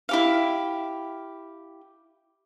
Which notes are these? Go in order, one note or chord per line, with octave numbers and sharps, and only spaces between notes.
E4 G4 F5